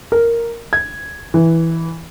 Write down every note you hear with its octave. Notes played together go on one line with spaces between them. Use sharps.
A#4
G#6
E3